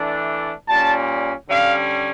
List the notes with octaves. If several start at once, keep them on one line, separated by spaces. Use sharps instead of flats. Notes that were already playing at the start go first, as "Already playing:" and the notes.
Already playing: E3 A3 D4
A#2 G3 C#4 A5
D3 G3 C#4 F5